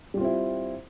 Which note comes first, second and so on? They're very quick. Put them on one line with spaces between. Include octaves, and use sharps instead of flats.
G3 F4 C4 E4